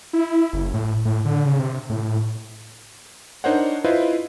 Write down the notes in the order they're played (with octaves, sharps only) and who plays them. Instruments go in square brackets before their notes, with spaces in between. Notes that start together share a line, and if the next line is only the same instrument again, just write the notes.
[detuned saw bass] E4
F#1
A2
A2
D3
C#3
C3
A2
[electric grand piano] D4 D#4 A#4 C5 C#5 F#5
E4 F4 B4 C5 D#5